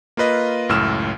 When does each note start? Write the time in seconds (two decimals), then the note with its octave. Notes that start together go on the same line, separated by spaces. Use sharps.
0.17 A#3 F4 B4 D#5
0.69 C#2 F#2 A2 E6 F6 E7